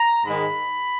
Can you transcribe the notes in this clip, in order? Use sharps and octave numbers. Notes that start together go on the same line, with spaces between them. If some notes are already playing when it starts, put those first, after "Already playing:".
Already playing: A#5
G#2 D#3 G#3 B5